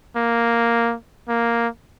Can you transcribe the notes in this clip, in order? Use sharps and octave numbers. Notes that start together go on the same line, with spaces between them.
A#3
A#3